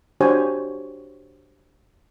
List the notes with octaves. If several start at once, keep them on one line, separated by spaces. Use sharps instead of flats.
D4 F#4 G4 C5 C#5 G#5